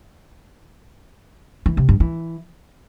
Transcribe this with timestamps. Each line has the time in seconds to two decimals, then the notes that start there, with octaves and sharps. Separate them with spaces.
1.66 E3
1.77 C3
1.89 G2
2.00 E3